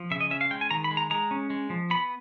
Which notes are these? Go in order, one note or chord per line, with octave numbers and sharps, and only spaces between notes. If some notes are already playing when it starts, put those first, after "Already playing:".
Already playing: F3
C#3 E5
D#5
C#4 E5
F5
G#3 G5
G#5
D#3 A#5
B5
G#3
A#5
G#3 A#5
C#4
G#3
F3
B3 B5